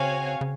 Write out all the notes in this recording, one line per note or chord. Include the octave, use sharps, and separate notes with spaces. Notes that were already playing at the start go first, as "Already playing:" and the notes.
Already playing: C#3 C4 F#4 C#5 F5 G#5
C#3